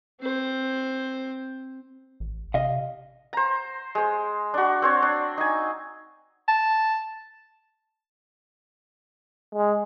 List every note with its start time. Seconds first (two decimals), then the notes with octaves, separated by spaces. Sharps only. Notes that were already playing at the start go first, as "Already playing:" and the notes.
0.21 C4 C5
2.20 A1
2.54 C3 D#5 F5
3.33 C5 A#5
3.95 G#3 C5
4.54 D4 F#4
4.82 C4 C5 C#5
5.02 D4
5.38 D#4 G#5
6.48 A5
9.55 G#3